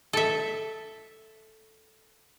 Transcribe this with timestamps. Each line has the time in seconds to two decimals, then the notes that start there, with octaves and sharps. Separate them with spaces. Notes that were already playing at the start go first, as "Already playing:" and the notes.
0.13 A4 E5